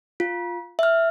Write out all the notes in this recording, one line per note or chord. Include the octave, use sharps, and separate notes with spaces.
F4
E5 F6